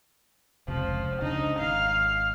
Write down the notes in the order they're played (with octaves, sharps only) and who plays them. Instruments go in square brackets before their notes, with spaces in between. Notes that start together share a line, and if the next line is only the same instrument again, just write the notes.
[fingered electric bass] F1 C#2 C3 [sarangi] F3
[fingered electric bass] C#2 C#3 D4 [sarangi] D#4
[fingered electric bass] G#1 [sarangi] F5